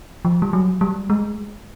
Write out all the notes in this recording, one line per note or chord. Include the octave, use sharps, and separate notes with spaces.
F3
G3
F#3
G3
G#3